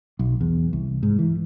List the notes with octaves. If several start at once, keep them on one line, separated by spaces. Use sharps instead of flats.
B1
E2
C2
G#2
E3